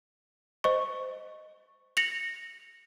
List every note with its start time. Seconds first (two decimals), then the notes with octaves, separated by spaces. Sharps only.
0.64 C5 D#5 C#6
1.97 A#6 C#7 F7 F#7